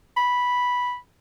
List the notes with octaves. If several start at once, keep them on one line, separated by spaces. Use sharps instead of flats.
B5